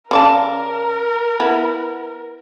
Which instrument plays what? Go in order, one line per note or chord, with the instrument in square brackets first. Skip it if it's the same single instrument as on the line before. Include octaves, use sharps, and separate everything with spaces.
[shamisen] C#3 D5 A5 [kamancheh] A#4
[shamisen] B3 E4 B4